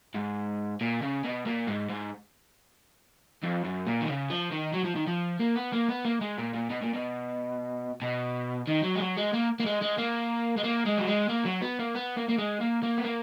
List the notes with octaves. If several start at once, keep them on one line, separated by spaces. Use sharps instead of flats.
G#2
A#2
C#3
B2
A#2
G#2
G#2
F2
F#2
A#2
D#3
C#3
F3
D#3
F#3
F3
D#3
F3
A#3
B3
A#3
B3
A#3
G#3
A#2
A#2
B2
A#2
B2
B2
D#3
F#3
G#3
F#3
G#3
A#3
A#3
G#3
G#3
A#3
G#3
A#3
G#3
F#3
G#3
A#3
F#3
B3
A#3
B3
A#3
A#3
G#3
A#3
A#3
B3
A#3